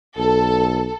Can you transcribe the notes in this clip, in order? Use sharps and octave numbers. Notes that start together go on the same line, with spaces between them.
B1 A4